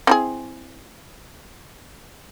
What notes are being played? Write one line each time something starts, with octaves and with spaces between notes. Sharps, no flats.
C4 E4 G#4